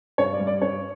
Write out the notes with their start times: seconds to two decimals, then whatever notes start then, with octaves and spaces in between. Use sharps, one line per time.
0.18 G2 C#5
0.33 D5
0.40 G3
0.47 D5
0.62 G2 C#5